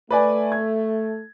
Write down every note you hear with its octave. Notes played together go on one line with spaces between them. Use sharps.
A3 B4 D5 G#5
G#6